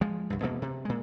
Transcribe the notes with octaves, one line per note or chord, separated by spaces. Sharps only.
F3 G#3
C2 G2
E1 D2 B2 A#3
C3
A#2 G#3